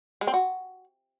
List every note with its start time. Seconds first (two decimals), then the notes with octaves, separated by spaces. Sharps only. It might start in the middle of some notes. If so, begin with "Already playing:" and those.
0.21 G#3
0.27 C4
0.34 F#4